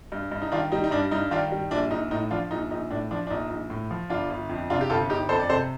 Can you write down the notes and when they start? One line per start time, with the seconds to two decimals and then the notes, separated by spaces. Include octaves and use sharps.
0.12 G2
0.31 G2
0.42 D#4
0.52 D#3 D4 F4
0.72 G3 D#4
0.84 D#4
0.91 G2 D4
1.11 G2 D#4
1.31 D#3 D4 F4
1.52 G3
1.71 A#1 D4
1.91 A#1 D#4
2.11 A2 D#4
2.31 F3 D4 F4
2.51 A#1 D#4
2.71 A#1 D#4
2.91 A2 D4
3.11 F3 D4
3.27 D4
3.30 A#1 D#4
3.50 A#1
3.70 A2
3.91 F3
4.10 G1 D4 F4
4.30 G1
4.49 F2
4.70 C3 D4 F4
4.81 G4
4.90 G1 F4 A4
5.10 G1 D#4 G4
5.29 F2 A4 C5
5.39 D5
5.49 C3 A4 C5